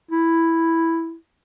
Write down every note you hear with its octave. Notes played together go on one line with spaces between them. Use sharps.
E4